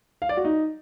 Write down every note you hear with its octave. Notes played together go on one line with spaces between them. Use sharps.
F5
D5
F#4
D#4